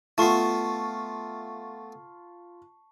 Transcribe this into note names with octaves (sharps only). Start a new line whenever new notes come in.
A3 B3 F4 A5 C#6 C7